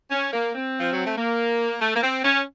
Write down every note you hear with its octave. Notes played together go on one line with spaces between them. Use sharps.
C#4
A#3
C4
F3
F#3
A3
A#3
A3
A#3
C4
C#4